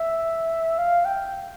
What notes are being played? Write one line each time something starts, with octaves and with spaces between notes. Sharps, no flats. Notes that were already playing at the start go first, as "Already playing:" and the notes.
Already playing: E5
F5
G5